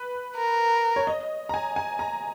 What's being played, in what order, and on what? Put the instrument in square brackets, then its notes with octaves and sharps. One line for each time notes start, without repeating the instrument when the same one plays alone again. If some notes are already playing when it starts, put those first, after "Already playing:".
Already playing: [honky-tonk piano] B4
[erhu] A#4
[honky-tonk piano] C#5
D#5
A#5
G#5
G#5
A#5